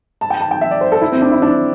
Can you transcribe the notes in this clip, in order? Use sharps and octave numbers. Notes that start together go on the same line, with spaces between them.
A5
G5
A5
G5
E5
D5
C5
A4
E4
C4
D4
E4
D4